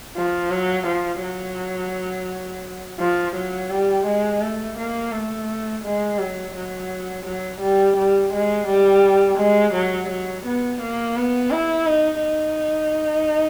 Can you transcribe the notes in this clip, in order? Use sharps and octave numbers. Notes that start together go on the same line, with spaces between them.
F3
F#3
F3
F#3
F3
F#3
G3
G#3
A3
A#3
A3
G#3
F#3
F#3
F#3
G3
G3
G#3
G3
G#3
F#3
F#3
B3
A#3
B3
E4
D#4
D#4